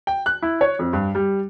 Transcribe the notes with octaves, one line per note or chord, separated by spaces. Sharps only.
G5
F#6
E4
C#5
F2
G2
G3